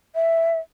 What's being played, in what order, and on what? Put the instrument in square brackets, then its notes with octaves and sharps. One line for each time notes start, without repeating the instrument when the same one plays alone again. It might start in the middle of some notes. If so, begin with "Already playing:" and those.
[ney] E5